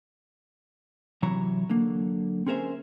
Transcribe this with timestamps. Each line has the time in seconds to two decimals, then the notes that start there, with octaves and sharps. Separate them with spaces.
1.23 C3 E3 F#3 E4 C#5 A#5
1.70 D3 F#3 A#3
2.46 C4 C#4 G#4 A#4 C5 E5